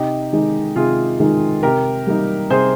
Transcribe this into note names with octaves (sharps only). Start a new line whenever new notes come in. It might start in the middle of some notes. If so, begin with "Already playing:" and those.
Already playing: C3 D#4 G4
D#3 G#3 D#4
C3 F4 G#4
D#3 G#3 D#4
C3 G4 A#4
G3 A#3 D#4
C3 G#4 C5